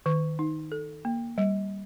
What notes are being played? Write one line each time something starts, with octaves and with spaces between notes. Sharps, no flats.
D#3
D#4
A4
A#3
G3